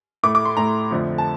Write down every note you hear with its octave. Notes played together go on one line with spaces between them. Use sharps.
A2 A3 D6
D6
C6
A2 A3 A#5
F2 D3 F3 A3
A5